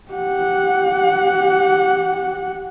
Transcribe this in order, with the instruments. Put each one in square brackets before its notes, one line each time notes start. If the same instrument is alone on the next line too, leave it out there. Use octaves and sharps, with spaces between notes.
[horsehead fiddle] G4 F#5